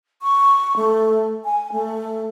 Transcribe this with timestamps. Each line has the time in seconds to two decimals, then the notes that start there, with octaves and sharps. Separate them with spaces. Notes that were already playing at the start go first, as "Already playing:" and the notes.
0.22 C#6
0.76 A3
1.45 G#5
1.72 A3